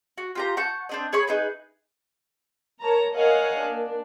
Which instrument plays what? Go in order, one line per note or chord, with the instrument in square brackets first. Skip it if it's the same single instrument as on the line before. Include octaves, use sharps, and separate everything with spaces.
[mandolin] F#4
F4 G4 A#5
F#5 A5 C#6 G6
C4 D4 D#5
G#4 C#5 B5 C#6
D#4 G#4 B4
[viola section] A#4 C#5 A5 A#5
A#4 C#5 D#5 F5 F#5 G#5
A#3 D4